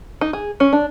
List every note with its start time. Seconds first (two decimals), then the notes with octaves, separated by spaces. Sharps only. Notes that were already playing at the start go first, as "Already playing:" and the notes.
0.21 D#4
0.33 G#4
0.60 C#4
0.73 D4